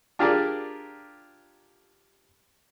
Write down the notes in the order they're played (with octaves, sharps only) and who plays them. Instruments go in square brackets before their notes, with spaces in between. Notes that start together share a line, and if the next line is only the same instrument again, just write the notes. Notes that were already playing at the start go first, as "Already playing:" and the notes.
[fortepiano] D4 F4 G4 G#4 A#4 D5